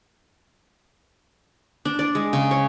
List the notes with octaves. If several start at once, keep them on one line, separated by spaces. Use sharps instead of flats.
D4
D5
G#3
C#3
C#5